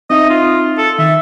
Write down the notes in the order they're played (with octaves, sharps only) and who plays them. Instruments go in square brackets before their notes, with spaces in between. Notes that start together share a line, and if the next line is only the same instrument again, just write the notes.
[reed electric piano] C4 D#4 E5 [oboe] D#5
[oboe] F4
A4
[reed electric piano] D#3 [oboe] E5